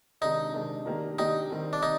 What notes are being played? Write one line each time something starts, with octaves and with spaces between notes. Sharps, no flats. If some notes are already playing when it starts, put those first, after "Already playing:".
C3 D#3 G#3 D4 D#4
C3 D#3 G#3 D4
D#3 A#3 D4 G4
D#3 A#3 D4 D#4 G4
D#3 G3 C4
D4
D#3 D#4